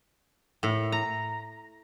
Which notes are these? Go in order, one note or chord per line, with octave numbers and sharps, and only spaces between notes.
A2
A#5